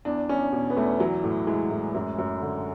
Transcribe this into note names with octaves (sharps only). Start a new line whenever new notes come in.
E2 D4
E2 C#4
B2
B3
E2 A3
E3 F#3
A2
E3 G#3
A2
F#2
F#2
D3